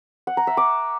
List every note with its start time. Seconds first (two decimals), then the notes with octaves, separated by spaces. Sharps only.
0.27 F#5
0.37 A#5
0.47 E5
0.57 D6